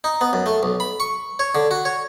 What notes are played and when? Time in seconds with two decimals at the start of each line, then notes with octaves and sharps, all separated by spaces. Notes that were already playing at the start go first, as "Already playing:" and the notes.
0.04 D#4
0.21 B3
0.33 F#2
0.46 A3
0.63 B1
0.80 B5
1.00 C#6
1.39 C#5
1.55 D3
1.71 F#4
1.85 C#5